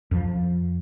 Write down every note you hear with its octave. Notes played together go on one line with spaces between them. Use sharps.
F2 F3